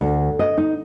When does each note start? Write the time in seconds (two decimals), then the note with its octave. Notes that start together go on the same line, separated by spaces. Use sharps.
0.01 D2
0.39 D#5
0.57 D#4